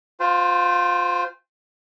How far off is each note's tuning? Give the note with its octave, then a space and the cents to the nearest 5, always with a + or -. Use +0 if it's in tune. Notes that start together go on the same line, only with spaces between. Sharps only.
F4 +20 C5 -25 G5 +35